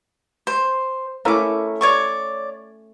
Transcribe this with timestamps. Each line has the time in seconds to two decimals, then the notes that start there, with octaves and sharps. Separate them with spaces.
0.47 C5
1.25 A3 C#4 E4 A#4 D6
1.81 C#5 D5 C#6